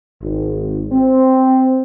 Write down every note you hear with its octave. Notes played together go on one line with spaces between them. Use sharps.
G#1
C4